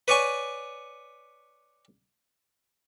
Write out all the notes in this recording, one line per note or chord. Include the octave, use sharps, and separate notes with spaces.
B4 C#5 D5 G#5 C#6